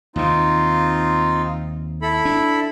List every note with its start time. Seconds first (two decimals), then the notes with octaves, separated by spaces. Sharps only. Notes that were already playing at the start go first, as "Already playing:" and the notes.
0.16 D#2 C3 C4 D#4 F4
2.02 E4 A4 B5
2.25 D4